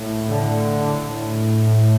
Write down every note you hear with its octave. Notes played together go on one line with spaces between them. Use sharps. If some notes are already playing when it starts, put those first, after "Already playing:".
Already playing: A2
D3
A2